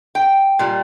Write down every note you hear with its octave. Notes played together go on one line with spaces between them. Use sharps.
G5
A#2 G3